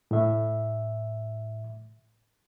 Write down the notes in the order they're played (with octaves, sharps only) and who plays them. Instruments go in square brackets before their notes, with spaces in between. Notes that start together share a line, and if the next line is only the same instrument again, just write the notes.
[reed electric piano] A2 E5